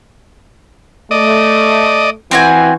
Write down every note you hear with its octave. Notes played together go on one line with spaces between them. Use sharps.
A3 D5 D#5
E3 C4 F#4 G#5